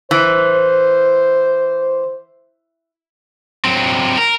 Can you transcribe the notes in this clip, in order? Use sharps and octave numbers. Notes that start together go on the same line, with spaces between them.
E3 C5
F#3 C4
A#4